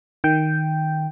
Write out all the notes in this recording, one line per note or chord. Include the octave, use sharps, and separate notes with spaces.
D#3 G5